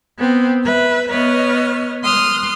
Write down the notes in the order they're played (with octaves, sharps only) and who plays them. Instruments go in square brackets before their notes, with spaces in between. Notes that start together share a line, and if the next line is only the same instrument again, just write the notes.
[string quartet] B3 C4
B4 E5
B3 B4 C#5 D#5 F6
C6 D#6 F6 F#6